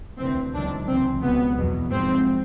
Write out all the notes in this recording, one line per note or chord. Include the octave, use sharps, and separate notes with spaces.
D2 C3 E3 C4
C#2 C3 D#3 F#3 D4
C#2 C3 E3 C4
C#2 B2 F#3 B3
E2 B2 F#3
G#2 F3 C4